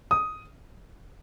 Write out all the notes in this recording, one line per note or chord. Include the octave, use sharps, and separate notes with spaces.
D#6